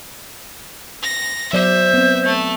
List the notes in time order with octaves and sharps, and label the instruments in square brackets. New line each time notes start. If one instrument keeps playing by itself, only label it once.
[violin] A#6
[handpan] F#3 B3 D5 [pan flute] C5 [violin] E5
[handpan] B3 C4
[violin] A3